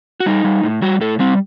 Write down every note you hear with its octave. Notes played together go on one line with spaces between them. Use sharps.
F#4
G3 D#4
G3
A2
G3 F#4
A2 A4
G3 C4